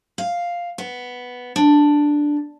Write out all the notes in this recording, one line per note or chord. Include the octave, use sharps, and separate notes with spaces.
F5
B3
D4